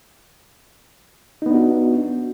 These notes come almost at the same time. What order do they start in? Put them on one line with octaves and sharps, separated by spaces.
D#4 B3 D4 F#4